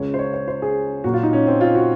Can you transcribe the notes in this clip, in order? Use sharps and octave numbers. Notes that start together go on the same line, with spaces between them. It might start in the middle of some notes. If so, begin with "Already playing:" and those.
Already playing: C#2 C#3 G#3 C#5
C5
C#5
C#5
C5
G#4
A#2 F#3 A#3 F#4
F4
D#4
C#4
C4
F4
F#4